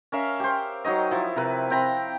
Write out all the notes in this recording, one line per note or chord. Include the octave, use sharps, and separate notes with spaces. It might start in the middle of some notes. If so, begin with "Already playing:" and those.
C#4 A#4 E5 F5
G4 C5
F#3 D#4 C#5 D#5
F3 E4
C3 A#4 B4
C4 G5 A#5 B5